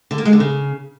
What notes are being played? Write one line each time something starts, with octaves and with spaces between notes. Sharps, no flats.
D3
A#3
G#3
D3
C#3